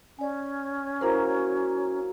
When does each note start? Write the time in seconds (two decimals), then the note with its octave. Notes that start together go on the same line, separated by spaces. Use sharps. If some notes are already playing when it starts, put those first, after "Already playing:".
0.19 C#4 D5 G#5
1.01 F#3 A#3 E4 A#4 C5